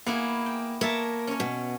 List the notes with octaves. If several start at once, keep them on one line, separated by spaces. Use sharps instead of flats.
A#3 B3 E4 G#4
G5
A#3 A#4 C#5 E5 A5
C#4 C#5
B2